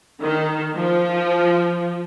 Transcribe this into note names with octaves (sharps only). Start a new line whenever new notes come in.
D#3
F3